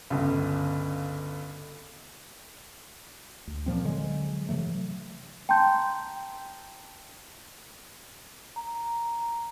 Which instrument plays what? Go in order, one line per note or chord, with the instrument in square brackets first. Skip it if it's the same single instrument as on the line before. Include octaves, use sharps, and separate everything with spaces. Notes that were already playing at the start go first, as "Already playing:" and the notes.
[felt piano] G1 C#2
[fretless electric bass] D2
A#2 F3 C4
D3 F#3 G#3
C3 E3 F#3 A3
[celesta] G5 A5 A#5 C6 G6
[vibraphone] A#5